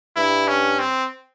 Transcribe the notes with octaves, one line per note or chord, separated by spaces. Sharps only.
G2 E4
C#4
C4